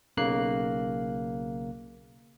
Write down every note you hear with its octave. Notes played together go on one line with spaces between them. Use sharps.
B1 C#3 A#3 F#6 C7